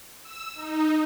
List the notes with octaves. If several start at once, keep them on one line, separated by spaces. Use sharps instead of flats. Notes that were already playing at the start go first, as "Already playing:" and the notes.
E6
D#4